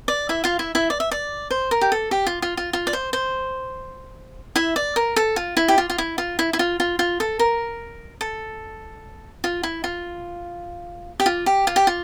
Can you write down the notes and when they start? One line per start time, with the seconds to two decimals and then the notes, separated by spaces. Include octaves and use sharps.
0.08 D5
0.29 E4 E5
0.44 F4 F5
0.59 E4 E5
0.75 E4 E5
0.90 D5
1.00 E5
1.11 D5
1.51 C5
1.71 A#4
1.81 G4
1.92 A4
2.11 G4
2.27 F4
2.42 F4
2.57 F4
2.73 F4
2.87 D5
2.93 C5
3.13 C5
4.56 E4 E5
4.76 D5
4.96 A#4
5.16 A4
5.36 F4
5.57 E4
5.68 G4
5.78 F4
5.90 F4
5.98 E4
6.18 F4
6.39 E4
6.53 E4
6.59 F4
6.80 F4
6.99 F4
7.20 A4
7.39 A#4
8.21 A4
9.44 F4
9.63 E4
9.84 F4
11.20 G4
11.26 F4
11.46 G4
11.67 F4
11.76 G4
11.87 F4